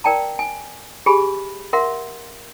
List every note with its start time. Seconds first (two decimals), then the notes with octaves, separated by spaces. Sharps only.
0.04 A#4 D5 G5 A5 A#5
0.39 G#5
1.06 G4 G#4 G#5 B5
1.73 A#4 E5 F#5 C6